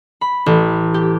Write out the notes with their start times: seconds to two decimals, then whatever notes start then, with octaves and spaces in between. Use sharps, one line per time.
0.21 B5
0.46 A1
0.94 G4